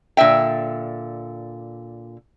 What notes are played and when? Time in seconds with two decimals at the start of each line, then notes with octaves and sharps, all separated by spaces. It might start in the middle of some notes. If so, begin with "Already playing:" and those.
0.17 A#2 D3 E5 G5